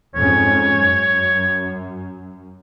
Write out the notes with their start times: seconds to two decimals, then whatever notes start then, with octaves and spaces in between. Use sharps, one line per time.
0.15 F2 G#2 C#4 C#5
0.78 F#2